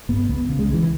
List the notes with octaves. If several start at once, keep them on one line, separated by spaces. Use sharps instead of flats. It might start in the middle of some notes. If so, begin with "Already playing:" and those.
G2 B3
C#2 B3
C#3
G#3
C#2
E3